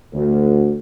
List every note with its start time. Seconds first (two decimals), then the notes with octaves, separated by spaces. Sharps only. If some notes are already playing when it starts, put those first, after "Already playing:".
0.13 D2